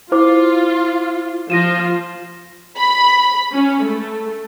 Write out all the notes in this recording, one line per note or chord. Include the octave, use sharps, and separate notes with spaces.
E4 F4 C5 D6
F3 F4 A#6 D#7 E7
B5
C#4
A3